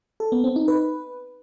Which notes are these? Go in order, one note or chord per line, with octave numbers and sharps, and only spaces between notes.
A4
B3
C4
D#4
B4